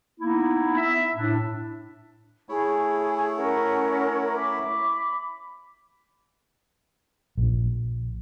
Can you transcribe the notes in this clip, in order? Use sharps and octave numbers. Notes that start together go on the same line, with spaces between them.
A#3 B3 D#4 E4
E5
A2 D4
A3 E4 G#4 C#5
C#4 A#4 F#5
B5 D6
A#1